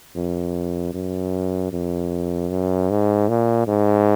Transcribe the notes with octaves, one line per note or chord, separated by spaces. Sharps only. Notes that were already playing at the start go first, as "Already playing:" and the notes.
F2
F#2
F2
F#2
G#2
A#2
G#2